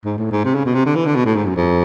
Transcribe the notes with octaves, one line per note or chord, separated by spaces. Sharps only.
G#2
A2
G#2
C3
C#3
B2
C3
D3
E3
D3
B2
A2
G#2
F#2
F2